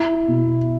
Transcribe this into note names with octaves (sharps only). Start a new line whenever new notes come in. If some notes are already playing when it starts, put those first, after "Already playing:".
Already playing: E4
B2